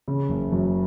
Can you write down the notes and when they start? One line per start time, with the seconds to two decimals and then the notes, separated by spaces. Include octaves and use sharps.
0.08 C#3
0.29 F#1
0.52 F#2